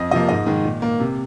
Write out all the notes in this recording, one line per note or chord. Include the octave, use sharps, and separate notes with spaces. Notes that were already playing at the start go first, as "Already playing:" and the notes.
Already playing: F2 D#5
C3 F3 A#3 D#5
G#2 D#5
D#3 G#3
A#2
A#3
C3